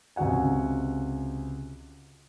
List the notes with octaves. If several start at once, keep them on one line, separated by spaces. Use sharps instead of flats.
C#2 C3 F#4 F#5 G#5